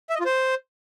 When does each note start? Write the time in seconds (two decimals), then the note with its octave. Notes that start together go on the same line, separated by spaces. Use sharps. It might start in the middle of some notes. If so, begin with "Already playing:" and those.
0.10 E5
0.15 D#5
0.20 F4
0.25 C5